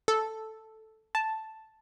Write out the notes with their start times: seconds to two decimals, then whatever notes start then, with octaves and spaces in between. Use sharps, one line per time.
0.08 A4
1.15 A5